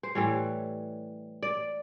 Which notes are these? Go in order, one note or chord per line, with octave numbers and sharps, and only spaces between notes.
C5
A2 E3 G3 C#5
D5